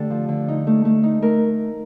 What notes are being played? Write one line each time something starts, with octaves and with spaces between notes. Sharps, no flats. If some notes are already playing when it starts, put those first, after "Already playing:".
Already playing: D3 A3 G4 A4
F3
D3
D#4
A3
A3
D#4
A3 A#4